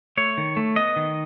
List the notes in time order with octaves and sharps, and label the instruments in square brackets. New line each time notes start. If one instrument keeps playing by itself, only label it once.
[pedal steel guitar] A3 C#5
D#3
A3
B3 D#5
D#3